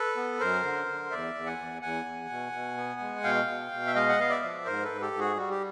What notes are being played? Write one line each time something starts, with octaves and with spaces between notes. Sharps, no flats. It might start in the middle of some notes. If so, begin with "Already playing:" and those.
Already playing: A4 B4
B3
F#2 A#4 C5
D3
D3
E2 D5 E5
E2
F#5 G#5
E2
E2 F#5 G#5
E2
B2
B2
B3
G#3
B2 F5 G5
B2
B2
E5
G#3 D#5 F5
F#5
B3 F5
D5 E5
F3
G#2 A#4 C5
A4 B4
G#2
G4 A4
G#2
F#4 G#4
G3 F#4
G4